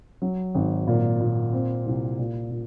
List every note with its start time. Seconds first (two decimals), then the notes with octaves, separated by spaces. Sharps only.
0.22 F#3
0.55 G#1
0.87 A#2
1.20 A#2
1.53 C4
1.86 C2
2.19 A#2
2.51 A#2